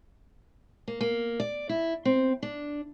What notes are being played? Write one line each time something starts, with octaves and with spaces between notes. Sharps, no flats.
A#3
A#3
D5
E4
C4
D4